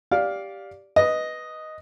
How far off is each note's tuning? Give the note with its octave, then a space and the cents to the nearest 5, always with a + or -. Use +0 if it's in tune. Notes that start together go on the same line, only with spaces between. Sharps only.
G4 +0 D5 -10 F5 +10
B4 +0 D#5 +0